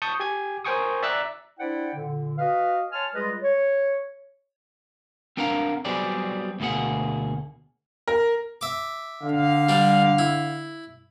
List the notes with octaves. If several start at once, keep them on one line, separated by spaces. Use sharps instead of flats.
A5 C#6 D#6 G6
G4 G#5 G#6
A#4 C5 G5 G#5 C#6 D#6
D5 E5 A#5 E6 F#6 A6
D4 E4 C5 D5 F#5 G5
A#2 D3
F#4 B4 D#5 F5
C#5 G#5 A5 C6 F6
G3 G#3 F4 G#4 B4 D#5
C#5
C4 D4 A#4 F5 F#5 A#5
F#3 G3 B3 C4 G#4 D5
D2 B2 A#3 G#4 F#5
A#4
E5 D6
D3 F5
G3 D4
E4